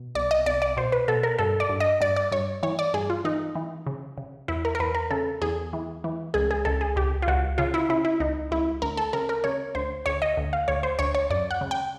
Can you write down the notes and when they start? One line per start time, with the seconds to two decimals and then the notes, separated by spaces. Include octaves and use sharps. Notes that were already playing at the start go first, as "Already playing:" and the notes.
Already playing: B2
0.15 C2 D5
0.31 D#5
0.46 C2 D5
0.62 D5
0.77 B2 C5
0.92 B4
1.08 B2 A4
1.23 A#4
1.39 G2 A4
1.60 D5
1.70 G2
1.80 D#5
2.01 G2 D5
2.16 D5
2.32 G2 C#5
2.63 E3 C#5
2.79 D5
2.94 G2 G#4
3.10 F4
3.25 E3 D#4
3.55 E3
3.87 C#3
4.18 C#3
4.48 E2 E4
4.65 A#4
4.75 A#4
4.80 E2 B4
4.95 A#4
5.11 C#3 A4
5.42 E2 G#4
5.73 E3
6.04 E3
6.34 C#2 G#4
6.51 G#4
6.65 C#2 A4
6.81 G#4
6.96 C#2 G4
7.22 F4
7.28 C#2 F#4
7.58 C#3 F4
7.74 E4
7.89 C#3 E4
8.05 E4
8.20 C#2 D#4
8.51 C#2 E4
8.82 D2 A#4
8.97 A4
9.13 C#3 A#4
9.29 A#4
9.44 C#3 C#5
9.75 D2 C5
10.06 D2 C#5
10.22 D#5
10.37 D2
10.53 F5
10.68 D2 C#5
10.83 C5
10.99 D2 C#5
11.15 C#5
11.30 F#2 D5
11.51 F#5
11.61 C#3
11.71 G5